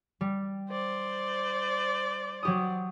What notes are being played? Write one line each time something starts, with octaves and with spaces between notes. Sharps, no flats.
G3
C5 D5
F#3 G4 D#6